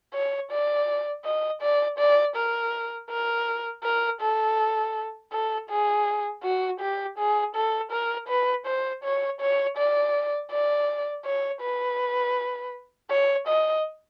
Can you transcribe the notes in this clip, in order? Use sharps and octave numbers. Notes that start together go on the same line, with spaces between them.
C#5
D5
D#5
D5
D5
A#4
A#4
A#4
A4
A4
G#4
F#4
G4
G#4
A4
A#4
B4
C5
C#5
C#5
D5
D5
C#5
B4
C#5
D#5